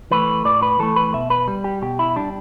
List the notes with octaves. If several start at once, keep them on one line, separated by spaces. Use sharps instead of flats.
E3 A3 B4
A2 D5
B4
E3 A3 A4
B4
B2 E5
B4
G3
G4
B2 G4
E4
G3 D4